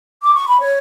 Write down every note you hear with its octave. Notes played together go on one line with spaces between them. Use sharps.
D6
C#6
B5
C#5